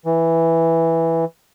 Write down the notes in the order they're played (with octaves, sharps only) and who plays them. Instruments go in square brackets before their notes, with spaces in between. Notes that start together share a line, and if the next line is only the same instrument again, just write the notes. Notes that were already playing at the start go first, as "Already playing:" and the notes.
[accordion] E3